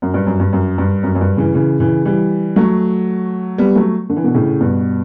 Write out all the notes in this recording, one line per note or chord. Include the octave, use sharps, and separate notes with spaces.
F#2
G2
F#2
G2
F#2
G2
F#2
F#2
G2
C#3 E3
C#3 E3
C#3 E3
E3 G3
F#3 A3
G3 B3
F#3 A3
D3
E3
B2 D3
A2 C#3
G2 B2